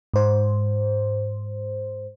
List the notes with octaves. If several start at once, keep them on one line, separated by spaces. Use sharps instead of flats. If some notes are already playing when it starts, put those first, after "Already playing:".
G#2 C5